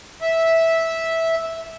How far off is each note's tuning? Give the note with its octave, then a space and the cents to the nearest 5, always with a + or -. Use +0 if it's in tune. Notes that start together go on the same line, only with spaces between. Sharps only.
E5 -10